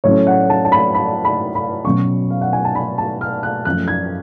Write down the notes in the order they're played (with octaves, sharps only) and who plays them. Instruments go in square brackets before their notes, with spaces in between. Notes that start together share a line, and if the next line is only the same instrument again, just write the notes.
[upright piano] A2 F#3 A3 C#4 C#5
F#5
A5
A5
B5
B5
B5
B5
B2 F#3 C#4 C#6
F5
F#5
G#5
A5
B5
A5
F6
F#6
F#2 F3 A3 F#6
G#6